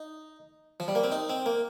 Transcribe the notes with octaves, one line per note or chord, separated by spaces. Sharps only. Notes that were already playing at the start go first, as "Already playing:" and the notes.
Already playing: D#4
F3
G3
A#3
C4
D#4
C4
A#3